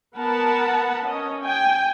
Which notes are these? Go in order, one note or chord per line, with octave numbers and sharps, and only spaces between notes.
B3 A#4 F#5 A5 B5
C#4 D#5
G5 G#5